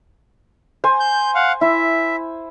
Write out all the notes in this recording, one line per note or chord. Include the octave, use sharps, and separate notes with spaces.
C5 G#5
G6
F5 F#5
E4 E5